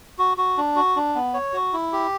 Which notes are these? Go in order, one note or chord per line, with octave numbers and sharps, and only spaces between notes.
F#4
F#4
D4
F#4
D4
B3
C#5
F#4
E4
G4